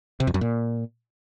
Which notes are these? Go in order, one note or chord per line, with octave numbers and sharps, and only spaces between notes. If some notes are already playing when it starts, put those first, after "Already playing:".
C3
F2
F#2
A#2